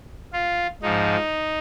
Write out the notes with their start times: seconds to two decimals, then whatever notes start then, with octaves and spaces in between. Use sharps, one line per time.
0.33 F4
0.82 G#2 F3 D#4